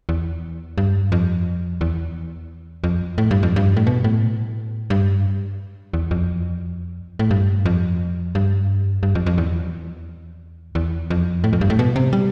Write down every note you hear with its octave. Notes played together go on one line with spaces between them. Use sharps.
E2
G2
F2
E2
F2
A2
G2
F2
G2
A2
B2
A2
G2
E2
F2
A2
G2
F2
G2
G2
F2
F2
E2
E2
F2
A2
F2
G2
A2
B2
C3
G3